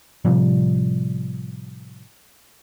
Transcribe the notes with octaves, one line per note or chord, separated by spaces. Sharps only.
A2 C3 F3 G3